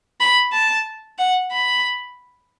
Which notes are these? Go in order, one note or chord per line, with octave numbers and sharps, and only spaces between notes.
B5
A5
F#5
B5